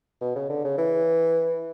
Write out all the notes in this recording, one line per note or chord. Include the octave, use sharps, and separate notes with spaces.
B2
C#3
D3
C#3
E3